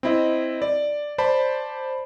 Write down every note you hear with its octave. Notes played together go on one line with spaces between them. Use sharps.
C4 E4 D#5
D5
C5 D5 A5 B5